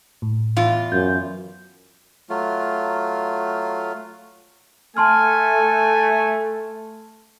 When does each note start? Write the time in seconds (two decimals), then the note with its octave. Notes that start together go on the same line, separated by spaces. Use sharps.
0.22 A2
0.56 E2 F4
0.92 F#2 G6
2.29 F#3 A3 F4
4.97 A3 A4 G#5 A5 C6 F6